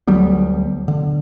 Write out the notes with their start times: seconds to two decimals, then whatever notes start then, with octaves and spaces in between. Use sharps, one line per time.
0.07 D2 F#3 G3 B3
0.88 D3